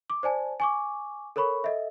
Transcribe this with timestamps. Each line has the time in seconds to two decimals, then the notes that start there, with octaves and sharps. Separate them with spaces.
0.10 D6
0.23 C5 D5 G#5 A5
0.60 G#5 C#6 D6
1.36 A4 A#4 C#5 B5 C#6
1.64 A4 D#5 E5